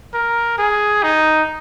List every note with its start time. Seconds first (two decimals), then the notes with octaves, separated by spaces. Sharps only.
0.14 A#4
0.58 G#4
1.03 D#4